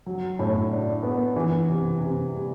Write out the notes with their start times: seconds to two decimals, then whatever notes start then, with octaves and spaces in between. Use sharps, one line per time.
0.06 F#3
0.39 A2
0.71 D4
1.03 B3
1.36 E3
1.69 C3
2.00 C3
2.32 G3